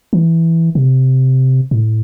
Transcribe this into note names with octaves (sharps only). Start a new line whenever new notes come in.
E3
C3
A2